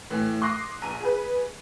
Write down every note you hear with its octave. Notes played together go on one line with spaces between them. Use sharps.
A2 E3
C6 D6 D#6 F#6 A#6 C7
A#1 A#5 D#7
G#4 B4